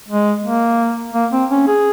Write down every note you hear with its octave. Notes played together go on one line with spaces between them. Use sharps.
G#3
A#3
A#3
C4
C#4
G#4